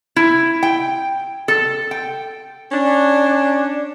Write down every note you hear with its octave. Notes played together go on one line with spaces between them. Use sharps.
E4
G5
A4
G5
C#4 D4